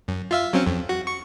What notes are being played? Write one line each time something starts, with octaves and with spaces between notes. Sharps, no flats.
F#2
F4 E5 F5
F#3 C4 C#4
F2
F#4
C#6